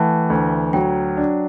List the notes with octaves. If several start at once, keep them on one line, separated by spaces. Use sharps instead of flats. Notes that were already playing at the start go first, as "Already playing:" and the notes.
Already playing: E3 A3 E5 F#5 G5 A5
D2
F#3 G5
D4